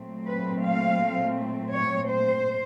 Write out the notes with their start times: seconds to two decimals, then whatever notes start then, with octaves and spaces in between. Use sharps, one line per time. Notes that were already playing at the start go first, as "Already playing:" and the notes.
Already playing: A#2 F#3 A3 C4
0.25 B4
0.62 F5
1.73 C#5
2.09 C5